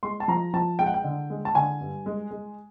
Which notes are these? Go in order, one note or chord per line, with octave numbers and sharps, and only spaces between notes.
G#3 C6
A5
F3 A#5
F3 A5
G#3 G5
F#5
G5
D3
G#3
A5
D3 G#5
G2
G#3
G#3